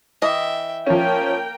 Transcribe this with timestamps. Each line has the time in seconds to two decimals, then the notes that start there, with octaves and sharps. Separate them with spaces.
0.22 E3 D#5 E5 G5
0.86 F3 A#3 C#4 A#4 G5